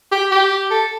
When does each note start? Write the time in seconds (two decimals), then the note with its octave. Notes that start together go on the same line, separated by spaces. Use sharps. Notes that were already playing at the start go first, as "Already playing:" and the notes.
0.12 G4
0.31 G4
0.71 A4